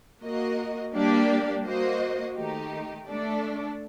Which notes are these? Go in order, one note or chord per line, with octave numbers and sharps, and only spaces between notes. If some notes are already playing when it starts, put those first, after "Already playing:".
A#3 F#4 A#4 D#5
G3 A#3 D4 G4 D5
A#3 F#4 C5 D#5
D#3 A3 D#4 G4
A3 D4 A4 D5